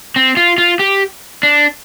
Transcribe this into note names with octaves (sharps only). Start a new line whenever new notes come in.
C4
F4
F4
G4
D4